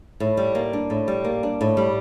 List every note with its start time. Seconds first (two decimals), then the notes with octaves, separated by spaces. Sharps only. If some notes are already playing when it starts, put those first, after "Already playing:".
0.20 A2
0.37 G3
0.55 A#3
0.73 D4
0.90 A2
1.08 G3
1.25 A#3
1.43 D4
1.61 A2
1.77 G3